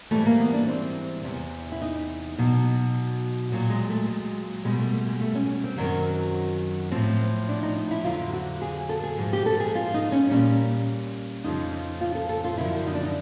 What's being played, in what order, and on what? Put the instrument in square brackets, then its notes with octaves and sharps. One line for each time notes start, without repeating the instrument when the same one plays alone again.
[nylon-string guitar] G#2 E3 G3 A3
A#3
B3
D4
C4
E2 C3 E3
E4
D#4
B2 F#3
A#2 F#3
G#3
A3
G#3
B2 G3 G#3
A3
A3
G#3
A3
C#4
C4
F#2 D#3 F#3
A2 F3 C4
D4
D#4
D#4
E4
F2 D3 F#3 F4
F#4
G#4
A4
G#4
G#2 F3
G4
A4
G#4
F4
D#4
C#4
A#2 G3 C#4
F2 C#3 F3 D#4
D#4
F4
A4
A4
F4
F#2 D3 F3 E4
D#4
D4
D#4